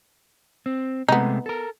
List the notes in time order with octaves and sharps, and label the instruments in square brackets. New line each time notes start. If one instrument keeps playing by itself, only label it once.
[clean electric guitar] C4
[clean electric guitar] C3 G#3 A3 [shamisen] B3 D#4
[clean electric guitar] A4 A#4